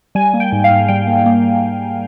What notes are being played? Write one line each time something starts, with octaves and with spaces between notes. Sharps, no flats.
G3 G#5
A#3
G5
G#2
F5
G#2
G3 G5
A#3
A#3